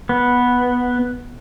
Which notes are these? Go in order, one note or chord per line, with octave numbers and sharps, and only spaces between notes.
B3